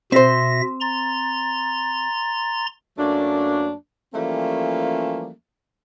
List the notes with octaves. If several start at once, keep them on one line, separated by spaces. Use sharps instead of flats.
B2 C4 C5 E5 A#6
A#5 C6 A6
F#2 F#3 A3 A#3 D4
E3 F3 G3 A3 A#3 C#4